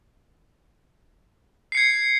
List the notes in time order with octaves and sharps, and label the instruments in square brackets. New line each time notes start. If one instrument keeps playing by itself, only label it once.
[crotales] C7
C#7
G#6